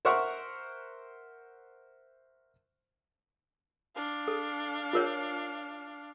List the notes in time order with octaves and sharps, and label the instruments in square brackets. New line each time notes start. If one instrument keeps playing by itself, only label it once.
[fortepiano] A#4 C5 E5 F#5 C#6
[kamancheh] D4 F5
[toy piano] A4
F4 A#4 C#5